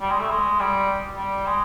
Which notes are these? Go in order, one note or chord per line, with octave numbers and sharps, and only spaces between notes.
G3
G#3
A3
G#3
G3
G3
G#3